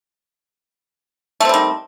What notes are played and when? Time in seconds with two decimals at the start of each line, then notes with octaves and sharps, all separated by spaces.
1.40 A3
1.45 C4
1.49 G3
1.54 D#3